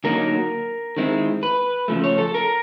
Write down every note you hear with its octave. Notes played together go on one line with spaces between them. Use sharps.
D3 F#3 A#3 D#4 A#4
D#3 G#3 C4 E4
B4
C#3 F3 A3
C#5
A4
A#4